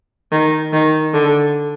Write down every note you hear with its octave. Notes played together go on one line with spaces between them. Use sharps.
D#3
D#3
D3